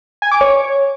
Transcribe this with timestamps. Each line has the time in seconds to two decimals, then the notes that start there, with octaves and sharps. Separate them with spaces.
0.22 G#5
0.31 D6
0.41 C#5